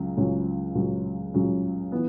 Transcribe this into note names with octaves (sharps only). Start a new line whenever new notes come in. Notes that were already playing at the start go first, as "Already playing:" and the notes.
Already playing: C#2 C#3 F#3
C#2 C#3 F#3
C#2 C#3 F#3
C#2 C#3 F#3
E3 B3